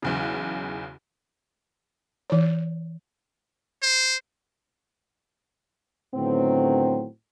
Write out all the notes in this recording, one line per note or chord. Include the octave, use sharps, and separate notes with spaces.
B1 E2 C#3
E3 C#5
C5
A2 D3 D#3 F#3 B3 C4